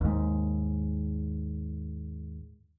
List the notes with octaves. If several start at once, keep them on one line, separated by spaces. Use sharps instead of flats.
D#2 G#2